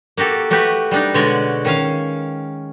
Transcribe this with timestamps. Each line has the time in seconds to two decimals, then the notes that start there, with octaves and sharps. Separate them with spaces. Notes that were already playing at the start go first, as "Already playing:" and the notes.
0.17 A#3 F#4 G4 A4
0.51 A3 F#4 G4 B4
0.91 G3 D4 D#4
1.14 B2 D3 G#3 F#4 C#5 D5
1.65 D#3 C#4 F5